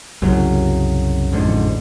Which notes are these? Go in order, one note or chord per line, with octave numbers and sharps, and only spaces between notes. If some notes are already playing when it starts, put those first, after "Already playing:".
C2 F#2 C#3 F#3
A1 F2 G#2 D3